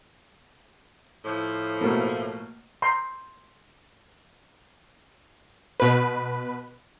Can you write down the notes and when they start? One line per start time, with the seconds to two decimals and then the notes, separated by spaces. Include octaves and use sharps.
1.25 A2 F3
1.81 B2 A3 A#3
2.82 A#5 C6
5.80 B2 B4